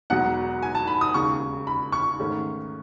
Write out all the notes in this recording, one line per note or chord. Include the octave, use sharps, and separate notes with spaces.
E1 E2 B2 F#3 F#5
G#5
A5
B5
D#6
E1 D#2 C#3 C#6
B5
C#6
G#2 D#3 A3 C#4